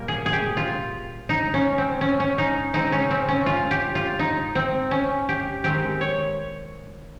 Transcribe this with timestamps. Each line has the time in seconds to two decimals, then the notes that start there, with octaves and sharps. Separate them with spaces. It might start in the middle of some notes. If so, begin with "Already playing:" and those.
Already playing: A#2 G3 A#3 A#4
0.08 G#4
0.26 G#4
0.33 G4
0.57 F4
1.29 D#4
1.54 C#4
1.78 C4
2.01 C#4
2.20 C#4
2.38 D#4
2.73 C#3 G#3 C4 D#4
2.92 C#4
3.11 C4
3.28 C#4
3.46 F4
3.71 G4
3.95 F4
4.19 D#4
4.55 C4
4.91 C#4
5.29 G4
5.64 D#3 G#3 C4 G4
6.01 C#5